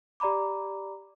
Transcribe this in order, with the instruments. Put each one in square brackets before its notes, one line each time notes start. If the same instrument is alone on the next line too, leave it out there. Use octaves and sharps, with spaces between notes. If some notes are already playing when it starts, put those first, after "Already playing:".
[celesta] G4 D5 A#5 B5 D6